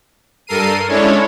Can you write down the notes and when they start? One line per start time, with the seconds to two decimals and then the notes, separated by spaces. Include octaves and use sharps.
0.47 G2 A4 A#4 C7 D#7
0.87 G#3 C#4 D4 E4 A4 C#5